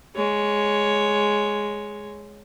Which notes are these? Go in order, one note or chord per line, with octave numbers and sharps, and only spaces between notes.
G#3 C#5